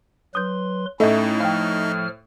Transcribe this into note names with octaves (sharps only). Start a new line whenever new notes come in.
F#3 B4 C6 D#6 G6
A2 A3 C#4 D#4 E4 A4 D#5 E5
F3 F5 G5 F6